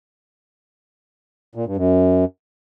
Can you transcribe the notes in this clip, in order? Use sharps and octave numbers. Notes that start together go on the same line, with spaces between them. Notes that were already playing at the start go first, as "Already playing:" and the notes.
A#2
G2
F#2